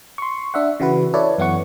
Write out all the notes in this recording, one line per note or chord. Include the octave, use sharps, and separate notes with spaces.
C6 C#6
D4 E5 F#5
C#3 E3 F#4 B4
E4 A4 B4 C#5 D5
F#2 E3 B3 E4 F#5 C#6